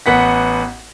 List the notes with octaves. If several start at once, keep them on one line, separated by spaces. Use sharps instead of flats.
A1 B3 F#5 B6